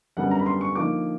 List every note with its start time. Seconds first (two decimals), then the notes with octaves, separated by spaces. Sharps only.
0.17 F#2 D3 G3 B3 F#5
0.31 A#5
0.39 B5
0.46 C6
0.61 C#6
0.75 D3 F3 A#3 D#4 D6